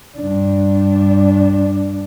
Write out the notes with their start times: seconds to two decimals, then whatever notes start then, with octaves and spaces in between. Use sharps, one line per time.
0.17 G2 D4